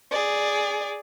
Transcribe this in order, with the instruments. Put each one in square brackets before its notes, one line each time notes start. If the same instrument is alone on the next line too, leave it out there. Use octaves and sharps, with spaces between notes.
[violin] G#4 D5